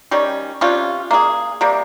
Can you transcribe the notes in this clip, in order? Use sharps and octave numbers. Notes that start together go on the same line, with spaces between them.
D#3 G3 C#4
C3 G3 C#4 F4
A#3 F4 G#4
C3 G3 A#3